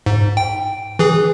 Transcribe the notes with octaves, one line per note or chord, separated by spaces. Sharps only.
G#2
G5
E3 G#4